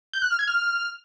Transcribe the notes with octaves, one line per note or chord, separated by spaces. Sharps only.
G6
F#6
F6
G#6
F6